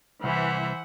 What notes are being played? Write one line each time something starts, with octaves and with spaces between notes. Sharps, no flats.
C2 E3 C5 E5 F#5